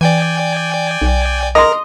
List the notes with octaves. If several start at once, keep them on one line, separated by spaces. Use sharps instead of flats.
E3 D5 G5 G#5
B1
A#4 D#5 A#5 C6